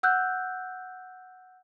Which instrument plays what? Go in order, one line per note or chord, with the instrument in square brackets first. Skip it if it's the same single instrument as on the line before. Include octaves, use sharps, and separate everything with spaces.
[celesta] F#5 E6 F#6 G6